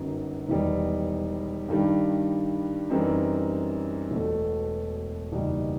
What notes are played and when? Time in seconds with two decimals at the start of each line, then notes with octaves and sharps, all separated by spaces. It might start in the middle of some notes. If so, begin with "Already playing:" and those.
Already playing: G1 F#2 F#3 B3 D#4
0.49 E1 E2 D#3 G3 D#4
1.69 G2 D#3 G3
2.90 F#2 E3 G3 C4 D#4
4.11 E1 E2 B2 A3
5.32 F#1 E2 B2 G3 D#4